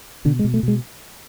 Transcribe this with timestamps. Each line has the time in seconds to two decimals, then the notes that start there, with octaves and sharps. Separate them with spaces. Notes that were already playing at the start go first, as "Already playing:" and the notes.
0.25 B2 D3
0.39 G#3
0.44 B2
0.54 A3
0.63 B2 G#3